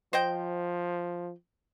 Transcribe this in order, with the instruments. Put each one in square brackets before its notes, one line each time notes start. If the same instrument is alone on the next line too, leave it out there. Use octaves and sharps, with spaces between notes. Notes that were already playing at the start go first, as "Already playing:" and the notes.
[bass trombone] F3 [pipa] C5 D#5 G5